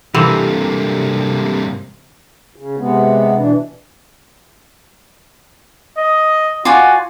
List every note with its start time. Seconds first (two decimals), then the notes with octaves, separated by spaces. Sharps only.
0.15 G2 C3 E3 A#3 C4 G4 A4 A#4
2.56 C#3
2.77 C3 G#3 B3
3.37 B2 E3 D4
5.97 D#5
6.65 F4 F#4 D5 G#5